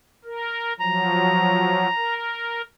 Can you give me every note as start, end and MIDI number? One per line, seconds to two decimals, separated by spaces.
0.24 0.73 70
0.80 1.87 53
0.80 1.87 54
0.80 2.14 82
1.96 2.62 70